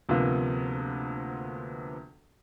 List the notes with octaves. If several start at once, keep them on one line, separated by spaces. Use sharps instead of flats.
D2 C3 F3 A#3 B3